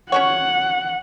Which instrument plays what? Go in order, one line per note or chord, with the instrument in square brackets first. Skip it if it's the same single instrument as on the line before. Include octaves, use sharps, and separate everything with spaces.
[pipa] C#4 F#4 C#5 [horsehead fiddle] F#5